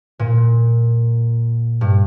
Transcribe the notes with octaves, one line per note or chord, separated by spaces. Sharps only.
A#2
G2